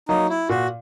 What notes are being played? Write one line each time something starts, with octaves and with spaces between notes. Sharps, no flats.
F#3 A#3 D#4
E4
A#2 F#4